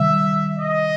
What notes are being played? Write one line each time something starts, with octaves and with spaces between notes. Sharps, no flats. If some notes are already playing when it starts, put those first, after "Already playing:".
Already playing: C3 D#3 G3 E5
D#5